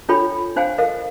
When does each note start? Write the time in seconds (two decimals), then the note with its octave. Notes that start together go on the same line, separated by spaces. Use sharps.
0.09 D4 F4 A4 C#5 G5 B5
0.56 D4 C5 F5 G5 G#5
0.78 A4 A#4 D#5 F5